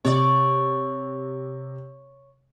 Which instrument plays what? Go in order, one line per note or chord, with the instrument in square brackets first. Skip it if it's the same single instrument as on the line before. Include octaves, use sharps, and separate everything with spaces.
[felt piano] C3 [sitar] C#5 D5